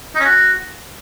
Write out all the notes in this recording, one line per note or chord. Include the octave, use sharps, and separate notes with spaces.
D#4
C#4
F#4